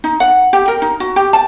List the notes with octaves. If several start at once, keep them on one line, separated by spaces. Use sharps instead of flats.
D#4
F#5
G4
A#4
D#4
F#4
G4
A5